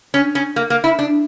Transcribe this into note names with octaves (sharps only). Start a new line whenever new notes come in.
C#4
C#4
A#3
A#3
E4
D4